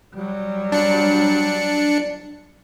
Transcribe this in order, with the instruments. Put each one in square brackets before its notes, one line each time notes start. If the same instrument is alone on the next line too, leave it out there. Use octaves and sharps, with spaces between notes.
[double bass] F#3 G3
[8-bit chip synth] D4 C#7